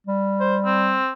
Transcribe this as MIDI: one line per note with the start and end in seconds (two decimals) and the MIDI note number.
0.07 1.00 55
0.40 0.57 72
0.65 1.13 60